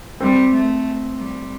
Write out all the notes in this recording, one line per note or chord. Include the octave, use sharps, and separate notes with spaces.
G3 C4
A3
G3